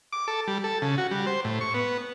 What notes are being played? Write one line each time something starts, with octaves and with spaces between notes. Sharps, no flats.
D6
A4
G3
A4
C#3
F#4
G3
C5
A2
C#6
B3